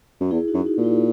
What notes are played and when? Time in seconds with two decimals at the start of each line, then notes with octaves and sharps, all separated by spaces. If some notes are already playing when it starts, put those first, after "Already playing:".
0.20 F#2
0.31 E2 E4 G#4
0.48 D#4 F#4
0.54 F#2
0.66 D#4 F#4
0.77 A#2
0.84 E4